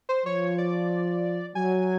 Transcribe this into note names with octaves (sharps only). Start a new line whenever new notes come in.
C5
F3 C#5
D5
F#3 G#5